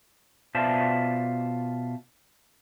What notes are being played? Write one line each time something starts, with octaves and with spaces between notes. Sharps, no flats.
B2 F4 C5 D5 E5 A5